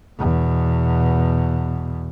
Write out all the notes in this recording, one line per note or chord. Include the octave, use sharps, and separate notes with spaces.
E2 B2